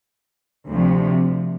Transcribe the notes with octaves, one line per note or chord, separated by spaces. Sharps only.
D2 C3 F3